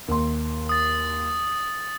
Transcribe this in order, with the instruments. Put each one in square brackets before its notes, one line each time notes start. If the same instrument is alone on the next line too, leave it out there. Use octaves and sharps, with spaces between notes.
[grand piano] D#2 C6
[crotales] D#6 A6